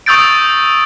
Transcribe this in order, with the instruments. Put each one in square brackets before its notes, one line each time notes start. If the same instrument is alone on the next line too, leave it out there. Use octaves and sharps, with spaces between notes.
[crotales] C#6 D#6 E6 G6 A6 D7